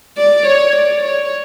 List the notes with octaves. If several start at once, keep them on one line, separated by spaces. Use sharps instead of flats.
D5
C#5
D5
C#5